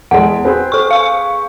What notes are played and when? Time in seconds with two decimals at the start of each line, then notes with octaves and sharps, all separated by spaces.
0.11 E2 G#3 F#5
0.45 C4 G#4 B4
0.72 A4 C#6
0.91 F5 C#6